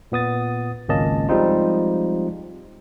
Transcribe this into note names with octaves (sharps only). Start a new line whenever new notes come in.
A#2 B3 D#6 A6
G#1 C#2 A#3 C#4 D#5 A5
F3 G3 G#3 C4 D#4 F4